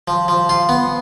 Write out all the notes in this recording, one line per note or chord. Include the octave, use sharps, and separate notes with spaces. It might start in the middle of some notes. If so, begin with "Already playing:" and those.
F3
F3
F4
B3